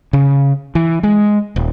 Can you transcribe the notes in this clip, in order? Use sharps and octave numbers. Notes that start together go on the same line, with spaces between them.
C#3
E3
G#3
D#1